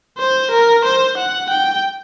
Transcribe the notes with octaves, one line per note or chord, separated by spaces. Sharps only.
C5
A#4
C5
F#5
G5